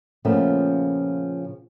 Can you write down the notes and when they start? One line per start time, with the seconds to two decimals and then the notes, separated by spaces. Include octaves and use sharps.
0.25 A#2 C#3 F3 A3 B3 C#4